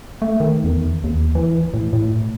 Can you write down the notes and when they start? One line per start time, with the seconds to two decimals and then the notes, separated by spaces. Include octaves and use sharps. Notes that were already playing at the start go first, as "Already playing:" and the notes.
0.22 A3
0.40 D#3
0.64 E2
1.04 D#2
1.35 E3
1.74 A2
1.93 A2